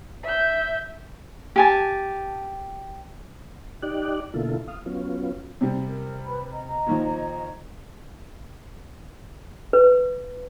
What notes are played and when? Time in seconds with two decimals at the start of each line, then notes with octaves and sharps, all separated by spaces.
0.22 E5 G6
1.56 G4 G#5 A5
3.82 D#4 G4 D5 F#6
4.34 B2 D3 A#3 E4 F4 A4
4.68 F5 D#6
4.86 F#3 B3 C#4 F4
5.61 C3 G3
5.85 A#4
6.24 B4 B5
6.50 D#5 A#5
6.86 A#2 D#3 F3
9.73 B4